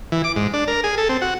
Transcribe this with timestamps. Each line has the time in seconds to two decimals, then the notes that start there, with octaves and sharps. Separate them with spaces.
0.12 E3
0.24 D6
0.36 G#2
0.54 D4
0.68 A#4
0.84 G#4
0.98 A4
1.09 C4
1.21 F#4